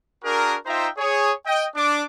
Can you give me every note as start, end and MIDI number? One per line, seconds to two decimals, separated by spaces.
0.25 0.55 62
0.25 0.55 66
0.25 0.55 68
0.25 0.55 70
0.66 0.88 63
0.66 0.88 65
0.66 0.88 72
0.66 0.88 76
0.66 0.88 79
0.66 0.88 82
0.98 1.32 68
0.98 1.32 73
1.46 1.65 75
1.46 1.65 79
1.75 2.03 62
1.75 2.03 86